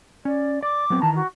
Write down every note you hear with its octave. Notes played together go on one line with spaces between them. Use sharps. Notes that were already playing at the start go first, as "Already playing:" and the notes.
C#4 D5
D5 D6
F#3 B3 C4
D#3 E3 A5 A#5
F#4